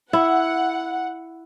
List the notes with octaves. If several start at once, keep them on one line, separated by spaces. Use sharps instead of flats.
E4 F#5